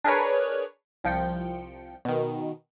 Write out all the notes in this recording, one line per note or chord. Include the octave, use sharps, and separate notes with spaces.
D4 G#4 A#4 B4 C#5
C2 F3 G5 C#7
B2 D#3